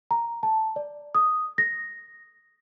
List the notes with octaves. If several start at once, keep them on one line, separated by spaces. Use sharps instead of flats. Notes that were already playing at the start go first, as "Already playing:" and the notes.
A#5
A5
D5
D#6
A#6